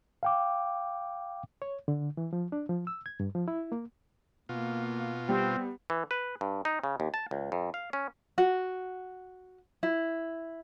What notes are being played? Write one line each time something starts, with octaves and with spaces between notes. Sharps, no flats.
F5 G5 D6
C#5
D3
E3
F3
D4
F3
E6
G#6
G2
F3
E4
A#3
B2 A#3 F4
G3 B3 C4
E3
B4
G2
D#4
C#3
D#2
A5
C#2
F2
F5
C#4
F#4
E4